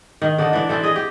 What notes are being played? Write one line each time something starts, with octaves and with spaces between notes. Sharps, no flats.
D#3
D3 D4 D#4
E3 D4
E3 C4 A4
G#4 D#5
G4